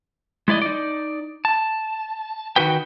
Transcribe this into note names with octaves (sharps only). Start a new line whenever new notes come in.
G#3 E4 D5 D#5
D#4 D5
A5
D#3 D#4 F#4 B4 G5